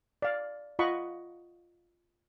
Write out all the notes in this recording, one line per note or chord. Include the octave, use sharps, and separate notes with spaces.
D5 F5
F4 D#5 F#5 B5 C#6